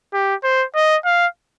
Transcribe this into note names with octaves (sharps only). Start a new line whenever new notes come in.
G4
C5
D#5
F5